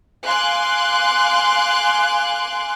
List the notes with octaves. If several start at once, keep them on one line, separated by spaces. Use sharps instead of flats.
F5 G#5 C6 D6 F#6